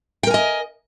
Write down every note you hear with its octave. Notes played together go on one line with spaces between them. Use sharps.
A#4 D#5 G5 G#5